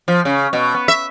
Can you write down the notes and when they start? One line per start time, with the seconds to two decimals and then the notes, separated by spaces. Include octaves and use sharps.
0.08 F3
0.25 C#3
0.53 B2
0.74 B3
0.88 E5